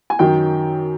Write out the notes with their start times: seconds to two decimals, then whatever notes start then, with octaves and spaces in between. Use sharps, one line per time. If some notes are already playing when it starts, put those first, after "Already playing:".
0.10 G#5
0.19 F#2 D#3 F#3 G5